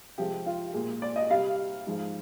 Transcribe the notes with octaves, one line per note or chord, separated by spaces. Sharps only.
C3 F3 G#3 G4
F4
A#2 G#3
D5
D#5
C3 G3 F5
G#2 F3 G#3